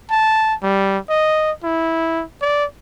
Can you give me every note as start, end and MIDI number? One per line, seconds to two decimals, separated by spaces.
0.10 0.54 81
0.63 0.98 55
1.09 1.51 75
1.64 2.24 64
2.41 2.65 74